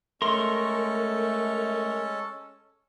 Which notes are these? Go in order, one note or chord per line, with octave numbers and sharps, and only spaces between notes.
G#3 A3 C#4 A4 A#4 C6 C#6